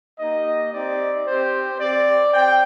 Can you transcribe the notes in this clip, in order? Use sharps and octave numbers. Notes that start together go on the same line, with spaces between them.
A#3 D#4 G4 D#5
C4 D#4 G4 D5
C4 G4 C5
C4 G4 D5
C4 G5